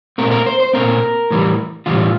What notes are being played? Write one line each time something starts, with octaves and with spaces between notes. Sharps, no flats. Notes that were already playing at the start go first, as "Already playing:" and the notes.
A#2 A3 C4 A#4
A#4
C5
C5
A#2 A3 C4 A#4
A2 E3 G3
A2 E3 G3 F4